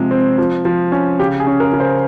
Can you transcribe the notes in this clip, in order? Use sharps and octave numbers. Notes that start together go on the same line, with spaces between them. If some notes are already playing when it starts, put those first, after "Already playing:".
Already playing: C3 F3 G#3
C4
F3
F3
C#4
C#3 G4
G#4
C#4
A#4
C#3
C5